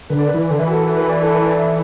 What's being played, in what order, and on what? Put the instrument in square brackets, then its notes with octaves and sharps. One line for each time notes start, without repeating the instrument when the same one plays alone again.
[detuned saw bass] D3 [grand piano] B4
[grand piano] D5
B4
[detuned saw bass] E3
D3
[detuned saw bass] E3 [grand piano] B4
[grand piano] F#4
A4
A4
B4
D5
A4
B4
D5
E5